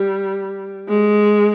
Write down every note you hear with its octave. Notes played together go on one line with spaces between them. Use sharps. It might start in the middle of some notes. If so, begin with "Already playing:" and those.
Already playing: G3
G#3